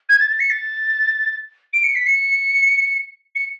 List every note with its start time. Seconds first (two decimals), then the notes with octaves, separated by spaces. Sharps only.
0.09 G#6
0.20 A6
0.31 A6
0.40 C#7
0.50 A6
1.73 D7
1.83 C#7
1.95 B6
2.06 C#7
3.35 C#7